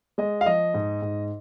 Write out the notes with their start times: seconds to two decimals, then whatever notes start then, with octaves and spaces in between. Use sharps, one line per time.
0.18 G#3 D#5
0.41 F5
0.46 F3 D#5
0.74 G#2
1.02 G#2